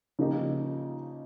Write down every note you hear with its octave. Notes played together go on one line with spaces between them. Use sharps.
C#3 F3 A#3 D#4 G4